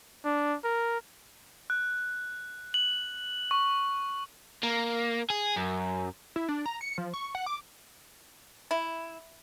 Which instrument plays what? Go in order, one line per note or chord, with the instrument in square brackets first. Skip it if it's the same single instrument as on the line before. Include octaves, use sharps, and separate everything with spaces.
[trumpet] D4
A#4
[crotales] F#6
F#7
C#6
[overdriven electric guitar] A#3
G#4
F#2
[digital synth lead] E4
D4
A#5
C#7
F3
C#6
F#5
D6
[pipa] E4